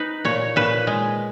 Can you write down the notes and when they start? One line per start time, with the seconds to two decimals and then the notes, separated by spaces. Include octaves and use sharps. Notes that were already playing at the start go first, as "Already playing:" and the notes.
Already playing: D#4 B4
0.25 A#2 C#5
0.56 A#2 B4
0.87 G#3